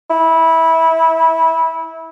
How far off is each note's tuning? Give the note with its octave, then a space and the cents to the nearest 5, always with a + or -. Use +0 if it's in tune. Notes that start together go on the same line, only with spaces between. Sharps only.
E4 -20